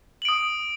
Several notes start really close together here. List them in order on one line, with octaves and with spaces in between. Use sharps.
F#7 D7 D#6